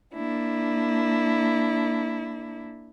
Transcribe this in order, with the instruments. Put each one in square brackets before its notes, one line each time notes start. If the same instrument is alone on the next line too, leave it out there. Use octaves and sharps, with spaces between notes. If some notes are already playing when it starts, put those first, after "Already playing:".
[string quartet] A#3 D4 E4